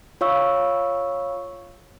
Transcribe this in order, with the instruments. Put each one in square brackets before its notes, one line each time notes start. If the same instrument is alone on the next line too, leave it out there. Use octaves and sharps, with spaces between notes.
[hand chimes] F4 C#5 F5 C#6 E6